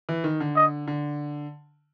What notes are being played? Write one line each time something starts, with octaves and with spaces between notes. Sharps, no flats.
E3
D#3
D3
D#5
D3